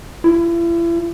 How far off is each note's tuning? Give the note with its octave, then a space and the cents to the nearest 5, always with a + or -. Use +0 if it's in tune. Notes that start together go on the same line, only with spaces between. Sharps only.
E4 +40